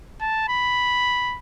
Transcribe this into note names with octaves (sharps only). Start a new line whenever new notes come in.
A5
B5